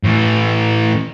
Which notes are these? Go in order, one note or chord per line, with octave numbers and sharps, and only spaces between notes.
A2 E3